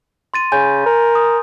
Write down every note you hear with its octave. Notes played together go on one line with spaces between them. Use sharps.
C6 A6 D#7
C#3 G#5 G6
A#4
D#6